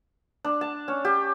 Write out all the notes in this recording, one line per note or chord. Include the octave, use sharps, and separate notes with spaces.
D4
A5
C#4
G4